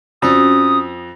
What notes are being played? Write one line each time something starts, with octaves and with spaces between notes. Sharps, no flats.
F2 C#4 F#4 D5 D#6